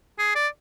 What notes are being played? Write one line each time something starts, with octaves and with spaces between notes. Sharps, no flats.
G#4
D5